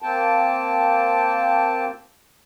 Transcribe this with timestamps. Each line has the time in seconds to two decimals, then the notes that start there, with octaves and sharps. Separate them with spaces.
0.02 A#3 C4 G5 A5